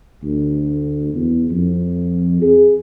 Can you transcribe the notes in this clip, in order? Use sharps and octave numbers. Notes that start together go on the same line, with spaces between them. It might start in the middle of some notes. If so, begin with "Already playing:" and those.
D2
E2
F2
G#4